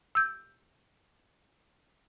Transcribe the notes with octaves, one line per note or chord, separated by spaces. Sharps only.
E6 G6